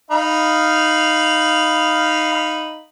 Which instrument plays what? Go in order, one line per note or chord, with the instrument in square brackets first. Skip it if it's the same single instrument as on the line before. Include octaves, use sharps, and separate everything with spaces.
[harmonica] D#4 F5 B5